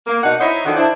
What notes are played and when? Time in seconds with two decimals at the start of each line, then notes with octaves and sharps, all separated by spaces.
0.07 A#3
0.23 B2 D4 D#4 F#5
0.40 D#4 E4 C5 C#5 D#5 E5
0.65 D3 D#3 F3 D#4 F#4 A4
0.76 D4 E4 C5